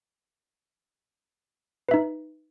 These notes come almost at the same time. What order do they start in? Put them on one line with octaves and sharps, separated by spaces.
B4 E5 D#4